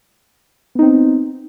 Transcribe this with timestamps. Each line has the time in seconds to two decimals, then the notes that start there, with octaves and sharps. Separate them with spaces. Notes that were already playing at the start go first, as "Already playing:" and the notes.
0.75 B3
0.79 D#4
0.82 C4